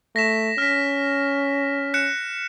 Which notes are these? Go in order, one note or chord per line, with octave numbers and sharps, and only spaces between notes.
A3 A#6 B6 E7
C#4 F6 B6
F#6 C#7 E7